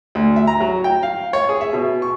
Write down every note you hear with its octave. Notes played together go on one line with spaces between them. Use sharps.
D2
E5
A#5
F#3
G5
F5
C#5
G#4
E5
B2
C#6